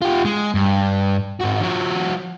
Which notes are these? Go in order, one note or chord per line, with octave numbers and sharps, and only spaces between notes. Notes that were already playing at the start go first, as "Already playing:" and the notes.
F4 G4
G#3
G2
G#2 F#4
F3 F#4